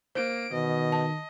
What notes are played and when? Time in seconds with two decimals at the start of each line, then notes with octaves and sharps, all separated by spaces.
0.15 A#3 C5 D7
0.52 B2 D#3 D#5
0.92 A5